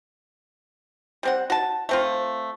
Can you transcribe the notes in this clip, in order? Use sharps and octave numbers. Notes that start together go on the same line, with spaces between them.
G3 C4 F#5
F#4 A5
A3 C4 F4